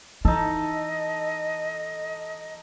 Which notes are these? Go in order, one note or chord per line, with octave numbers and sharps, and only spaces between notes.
E3 D#4 A4 D#5